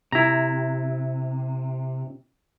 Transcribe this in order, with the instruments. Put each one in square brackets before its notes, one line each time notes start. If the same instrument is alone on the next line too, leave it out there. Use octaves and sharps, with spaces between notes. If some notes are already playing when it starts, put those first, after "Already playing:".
[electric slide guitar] C3 [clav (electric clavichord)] E4 A#5